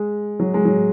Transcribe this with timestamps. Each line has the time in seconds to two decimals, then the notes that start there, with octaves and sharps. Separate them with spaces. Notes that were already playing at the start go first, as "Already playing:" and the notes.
Already playing: G#3
0.40 F#3
0.54 G#3
0.65 F#3